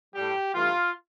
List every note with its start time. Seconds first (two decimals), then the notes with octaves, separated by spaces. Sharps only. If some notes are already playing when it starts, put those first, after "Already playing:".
0.14 A2 G3 G4
0.54 G2 E3 A3 F4